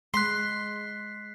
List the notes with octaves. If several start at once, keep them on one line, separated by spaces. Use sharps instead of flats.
G#3 C6 F#6 B6 C7